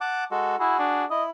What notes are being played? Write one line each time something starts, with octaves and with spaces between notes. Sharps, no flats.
F#5 A5 D6
G#3 F#4 A4
E4 F#4 G#4
D4
E4 D#5